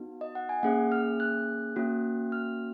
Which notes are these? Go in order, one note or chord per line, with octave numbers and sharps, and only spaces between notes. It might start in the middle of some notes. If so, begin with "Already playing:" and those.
Already playing: B3 D#4 F#4
D#5
F#5
G#5
A#3 C#4 G#4 F#5
F6
F#6
A#3 C#4 F#4
F6